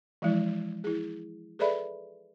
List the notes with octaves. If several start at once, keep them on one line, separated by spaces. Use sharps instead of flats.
E3 F3 G#3 E4
E4 G#4
G#4 A4 B4 D5 E5 B5